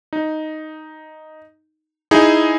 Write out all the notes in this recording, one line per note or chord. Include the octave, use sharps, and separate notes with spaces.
D#4
D#4 E4 G#4